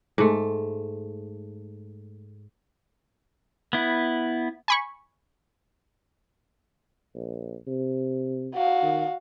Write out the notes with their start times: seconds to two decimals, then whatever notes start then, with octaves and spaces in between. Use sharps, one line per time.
0.18 G#2 A3
3.73 B3 E4
4.68 G#5 B5 C#6
7.15 A#1
7.67 C3
8.54 F#4 F5
8.83 D#3